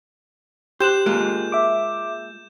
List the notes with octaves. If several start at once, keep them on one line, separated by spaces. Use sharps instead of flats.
G4 C5 F#6 G6 E7
G#3 A#3 F4
E5 D6